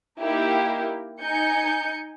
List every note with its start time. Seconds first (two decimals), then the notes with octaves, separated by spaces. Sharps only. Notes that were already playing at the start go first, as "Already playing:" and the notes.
0.20 A#3 D#4 E4 G4
1.22 D#4 G#5 G6 C#7